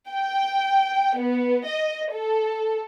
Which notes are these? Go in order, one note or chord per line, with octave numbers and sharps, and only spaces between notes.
G5
B3
D#5
A4